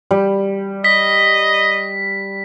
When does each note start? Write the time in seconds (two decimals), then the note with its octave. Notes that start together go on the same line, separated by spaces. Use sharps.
0.11 G3
0.84 D#5 B6